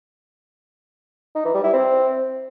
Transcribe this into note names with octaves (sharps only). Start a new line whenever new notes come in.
D#4
E3
G3
E4
C4